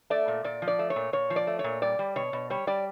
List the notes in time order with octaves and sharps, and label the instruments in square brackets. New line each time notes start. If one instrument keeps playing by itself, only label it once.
[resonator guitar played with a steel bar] A3 D5
A#2
A#2 D5
F3
D5
A3
C#5
A#2
A#2 C#5
F3
D5
A3
C#5
A#2
G3 D5
G3
B2 C#5
B2
G3 C#5
G3 D5